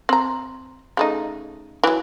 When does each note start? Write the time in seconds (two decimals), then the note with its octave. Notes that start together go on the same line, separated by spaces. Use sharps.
0.09 C4 A#5
0.97 C#3 A3 D#4
1.83 E3 F#3